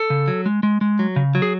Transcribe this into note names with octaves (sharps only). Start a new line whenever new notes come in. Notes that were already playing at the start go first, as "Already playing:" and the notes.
Already playing: A4
C#3
F#3
G#3
G#3
G#3
F#3
C#3
F#3
G#4